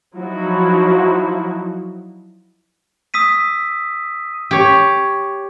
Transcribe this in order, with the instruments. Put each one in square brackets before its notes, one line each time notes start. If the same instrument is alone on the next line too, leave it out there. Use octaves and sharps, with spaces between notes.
[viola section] F3 F#3 D#4 E4 F#4
[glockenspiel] D#6 E6 B6 D#7
[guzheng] G4 C#5